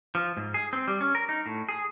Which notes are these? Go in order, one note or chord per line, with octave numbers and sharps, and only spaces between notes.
F3
G#2
G#4
C4
G3
C#4
A#4
D#4
A2
G#4